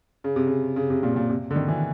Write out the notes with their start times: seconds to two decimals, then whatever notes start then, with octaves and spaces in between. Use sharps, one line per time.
0.24 C#3
0.36 C3
0.47 C#3
0.76 C#3
0.90 C3
1.03 A#2
1.16 A#2
1.29 C3
1.51 D3
1.56 D#3
1.68 E3